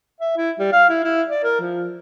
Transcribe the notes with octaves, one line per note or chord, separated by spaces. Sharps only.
E5
E4
G3
F5
E4
E4
D5
A#4
F3